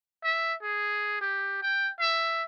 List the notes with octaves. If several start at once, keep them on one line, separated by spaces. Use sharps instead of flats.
E5
G#4
G4
G5
E5